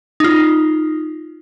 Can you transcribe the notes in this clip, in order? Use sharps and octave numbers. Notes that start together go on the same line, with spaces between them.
D#4 F4